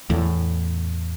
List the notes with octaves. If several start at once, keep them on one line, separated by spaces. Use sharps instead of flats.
E2 A2